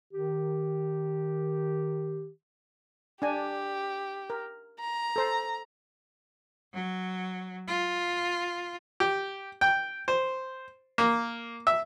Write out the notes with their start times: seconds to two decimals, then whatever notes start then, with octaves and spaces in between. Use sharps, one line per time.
0.12 D#3 G4
3.22 D4 G4 G#5
4.30 A#4
4.80 A#5
5.16 A4 C5
6.73 F#3
7.68 F4
9.00 G4
9.61 G5
10.08 C5
10.98 A#3
11.67 E5